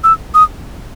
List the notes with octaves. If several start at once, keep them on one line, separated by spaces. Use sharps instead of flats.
E6
D#6